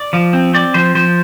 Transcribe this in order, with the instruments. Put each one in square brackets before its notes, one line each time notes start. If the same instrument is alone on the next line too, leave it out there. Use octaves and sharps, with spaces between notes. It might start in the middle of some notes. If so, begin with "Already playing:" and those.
Already playing: [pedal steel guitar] D5
F3
C4
C4 D5
F3 C5
F3 C5